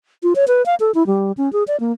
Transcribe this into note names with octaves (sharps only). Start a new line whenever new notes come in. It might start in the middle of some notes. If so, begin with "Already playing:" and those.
F4
C#5
B4
F5
A4
E4
G3
C#4
G#4
D5
A#3